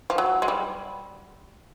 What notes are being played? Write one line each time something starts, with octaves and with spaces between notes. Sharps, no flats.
F3
F#3
G#3
G3